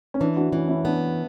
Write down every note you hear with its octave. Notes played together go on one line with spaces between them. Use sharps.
C#4
E3 D4
D4 F#4
E3 C#4 E4
C#4 E4
B3 D4